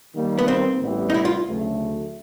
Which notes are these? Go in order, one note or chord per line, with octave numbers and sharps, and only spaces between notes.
D#3 G3 A#3
B3
C4
A1 G2 E3 G3 B3
D#4
E4
F4
D2 C#3 F#3 A3